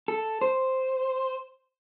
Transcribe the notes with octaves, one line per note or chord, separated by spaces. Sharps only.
A4
C5